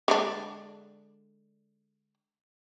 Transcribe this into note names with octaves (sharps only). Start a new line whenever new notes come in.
D3 G#3 D4